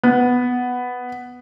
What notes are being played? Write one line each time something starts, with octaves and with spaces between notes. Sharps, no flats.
B3